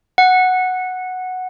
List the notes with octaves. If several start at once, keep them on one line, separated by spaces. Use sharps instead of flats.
F#5